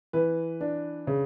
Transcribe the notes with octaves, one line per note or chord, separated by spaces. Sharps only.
E3 B4
D4
C#3